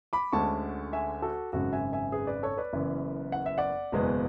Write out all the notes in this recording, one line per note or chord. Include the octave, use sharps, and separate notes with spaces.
B5 D6
D2 D3 G#3 C#4 A5 C#6
E5 G#5
F#4 A4
G#1 F#2 C#3 G#3 F#4 A4
E5 G#5
E5 G#5
G#4 B4
B4 D5
A4 C#5
B4 D5
F#1 F#2 C#3 E3 B3
F#5
E5
D5 F#5
F#1 E2 B2 G#3 B3